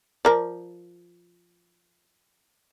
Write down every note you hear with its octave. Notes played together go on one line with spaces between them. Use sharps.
F3 A#4 D5